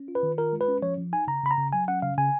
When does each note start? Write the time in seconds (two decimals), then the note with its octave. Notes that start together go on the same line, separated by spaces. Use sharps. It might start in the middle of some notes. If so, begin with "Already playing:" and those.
Already playing: C#4
0.08 F4
0.15 B4
0.23 D#3
0.38 F4 A#4
0.53 G#3
0.61 B4
0.68 C#4
0.82 F3 C#5
0.98 F3
1.13 D#4 G#5
1.27 C#3 A#5
1.43 C#3 B5
1.51 A#5
1.58 C#3
1.73 F#3 G#5
1.88 C#4 F#5
2.02 C#3 F5
2.18 C#3 G#5